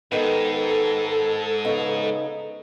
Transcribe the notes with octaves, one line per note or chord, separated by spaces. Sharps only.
G#2 D#3 B3 A4
C#3 B3 D#4